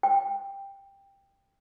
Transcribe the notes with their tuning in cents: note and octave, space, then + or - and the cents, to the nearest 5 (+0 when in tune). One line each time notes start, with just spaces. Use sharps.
G5 +10